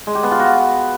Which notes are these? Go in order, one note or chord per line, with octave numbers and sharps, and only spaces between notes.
G#3
G4
B3
F4
F#4